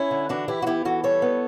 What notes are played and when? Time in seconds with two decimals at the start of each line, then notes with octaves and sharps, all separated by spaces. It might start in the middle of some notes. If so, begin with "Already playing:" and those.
Already playing: C#4 E4
0.11 D3
0.29 E3 D4 F#4
0.48 E3 E4 G4
0.62 F#4
0.66 B3 E4 G4
0.85 E3 F#4 A4
1.04 G3 A4 C#5
1.22 B3